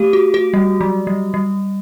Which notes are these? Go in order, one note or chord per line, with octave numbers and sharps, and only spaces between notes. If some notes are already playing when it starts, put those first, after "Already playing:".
Already playing: A3 G4
F#4
F#4
G3
F#3
G3
G3